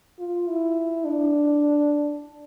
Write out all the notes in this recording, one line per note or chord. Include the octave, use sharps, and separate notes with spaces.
F4
E4
D4